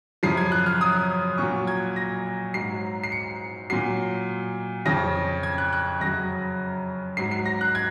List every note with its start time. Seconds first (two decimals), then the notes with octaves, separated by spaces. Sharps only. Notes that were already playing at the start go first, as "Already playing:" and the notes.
0.23 F#2 C#3 F3 C7
0.37 G#6
0.52 F#6
0.66 F6
0.81 D#6
1.38 A#2 F#3 C#6
1.67 G#6
1.96 A#6
2.54 G#2 F#3 C7
3.03 C7
3.12 C#7
3.70 A#2 F#3 C7
4.86 F2 C#3 F3 A#6
5.43 G#6
5.58 F#6
5.73 F#6
6.01 F#2 C#3 F#3 A#6
7.17 G#2 F#3 C7
7.31 C7
7.46 A#6
7.61 F#6
7.75 G#6